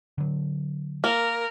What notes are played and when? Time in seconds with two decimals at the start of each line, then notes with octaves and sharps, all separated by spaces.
0.18 D3 F#3
1.04 A#3 A#4